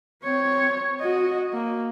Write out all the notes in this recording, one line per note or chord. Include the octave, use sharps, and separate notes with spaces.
C4 C#5
F#4 D#5
A#3